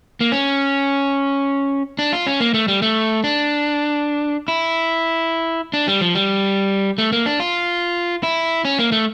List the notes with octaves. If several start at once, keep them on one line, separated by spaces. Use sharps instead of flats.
A#3
C#4
D4
F4
C#4
A#3
A3
G3
A3
D4
E4
D4
G3
F3
G3
A3
A#3
D4
F4
E4
C#4
A#3
A3